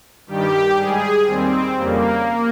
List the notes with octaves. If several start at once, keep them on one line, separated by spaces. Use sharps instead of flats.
G2 D#3 G3 G4
G#2 G3 G#4
D#2 D#3 G3 C4
F2 C#3 G3 A#3